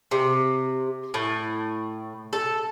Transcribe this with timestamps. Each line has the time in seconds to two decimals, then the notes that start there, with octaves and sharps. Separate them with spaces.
0.11 C3
1.14 A2
2.33 A4